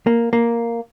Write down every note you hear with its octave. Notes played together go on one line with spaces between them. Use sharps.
A#3
A#3